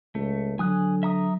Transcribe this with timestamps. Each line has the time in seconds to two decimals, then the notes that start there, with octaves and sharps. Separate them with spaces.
0.15 C#2 A3
0.59 D3 F#3 G#5 D#6 F#6
1.03 E5 A#5 D#6